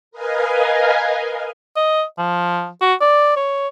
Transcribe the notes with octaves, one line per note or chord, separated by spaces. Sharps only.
A#4 B4 D#5 F5 G#5
D#5
F3
F#4
D5
C#5